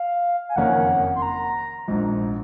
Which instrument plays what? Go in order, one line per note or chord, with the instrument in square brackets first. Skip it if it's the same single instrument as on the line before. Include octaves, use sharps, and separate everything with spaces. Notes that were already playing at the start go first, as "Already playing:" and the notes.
Already playing: [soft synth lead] F5
G#5
[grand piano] F#1 F2 D#3 A#3 C#4 [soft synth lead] F#5
[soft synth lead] C6
A#5
[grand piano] A#1 G#2 F3